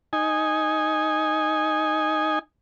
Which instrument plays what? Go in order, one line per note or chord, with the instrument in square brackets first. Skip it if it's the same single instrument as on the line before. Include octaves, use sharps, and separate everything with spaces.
[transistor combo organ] D#4 G#5